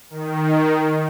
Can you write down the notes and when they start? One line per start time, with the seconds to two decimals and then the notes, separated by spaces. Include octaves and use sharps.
0.10 D#3